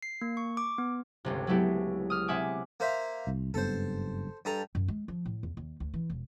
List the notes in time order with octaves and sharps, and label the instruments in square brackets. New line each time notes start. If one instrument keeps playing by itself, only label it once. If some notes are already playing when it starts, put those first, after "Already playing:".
[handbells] C7
A#3
C#6
D6
B3
[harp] G1 C#2 C3
F#3 G#3 A3 B3 E4 G4
D#6 F6
C3 C4 E5 F#5 G#5 D6
[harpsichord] A#3 C5 E5
[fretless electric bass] C2
[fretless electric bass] F#1 G2 B3 [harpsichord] A4 C5
[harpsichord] G2 A4 A#5
[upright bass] F#2
G#3
F3
A2
E2
D#2
D2
E3
E1